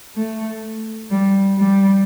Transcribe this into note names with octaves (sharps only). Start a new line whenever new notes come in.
A3
G3
G3